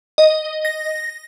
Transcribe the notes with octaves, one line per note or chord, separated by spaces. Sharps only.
D#5
A#6